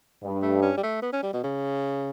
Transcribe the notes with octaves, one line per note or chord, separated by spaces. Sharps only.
G2
A3
C#4
G3
A3
B3
C#4
G3
B2
C#3